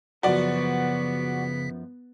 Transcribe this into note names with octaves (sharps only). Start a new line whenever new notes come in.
F#2 C#3 F3 B3 F#4 D5 B6